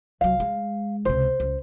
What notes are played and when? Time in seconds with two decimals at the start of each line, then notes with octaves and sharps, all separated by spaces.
0.21 C2 F#3 F5
0.40 G#3
1.05 C#2 C3 C5
1.40 C#2